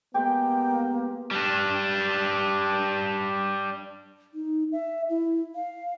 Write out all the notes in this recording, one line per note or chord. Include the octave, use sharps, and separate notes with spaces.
G#3 A#3 B3 G4 G5
G3 D4
D#4
E5
E4
F5